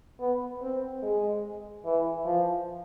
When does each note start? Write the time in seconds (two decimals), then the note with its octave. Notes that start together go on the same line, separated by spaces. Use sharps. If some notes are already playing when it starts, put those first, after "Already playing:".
0.20 B3
0.62 C4
1.02 G#3
1.85 E3
2.26 F3